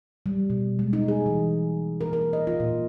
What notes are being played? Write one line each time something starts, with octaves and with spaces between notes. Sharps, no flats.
G3
B2
G#3
D#4
G#4
E3
A#4
A#4
D#5
F4
A#2